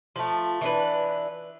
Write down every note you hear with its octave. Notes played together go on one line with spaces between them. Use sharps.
F3 A3
E3 D4 B4